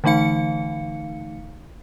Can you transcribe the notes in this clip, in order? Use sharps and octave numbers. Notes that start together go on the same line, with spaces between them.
D3 E3 A3 D#4 F5 C#7